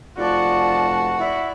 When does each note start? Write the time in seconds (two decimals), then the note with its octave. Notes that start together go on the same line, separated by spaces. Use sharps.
0.17 F1 F4 F#4 D5 A5
1.19 E4 D5